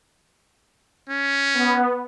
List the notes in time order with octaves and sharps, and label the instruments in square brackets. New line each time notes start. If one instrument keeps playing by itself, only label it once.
[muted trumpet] C#4
[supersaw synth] B3